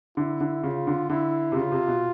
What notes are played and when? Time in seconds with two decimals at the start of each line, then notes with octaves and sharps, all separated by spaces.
0.17 D3 E4
0.40 D3
0.63 C#3 F4
0.87 D3
1.09 D3 E4
1.52 C3
1.56 C#3 F4
1.72 C3
1.88 B2